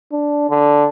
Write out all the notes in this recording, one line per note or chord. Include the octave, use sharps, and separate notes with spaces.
D4
D3